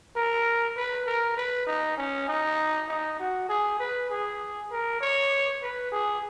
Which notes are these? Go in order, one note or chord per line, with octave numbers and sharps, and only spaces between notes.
A#4
B4
A#4
B4
D#4
C#4
D#4
D#4
F#4
G#4
B4
G#4
A#4
C#5
B4
G#4